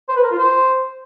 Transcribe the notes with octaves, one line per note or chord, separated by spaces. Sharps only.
C5
B4
A#4
F4
C5